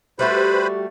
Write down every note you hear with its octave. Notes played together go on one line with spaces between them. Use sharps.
G3 A3 F#4 G4 B4 C5 B5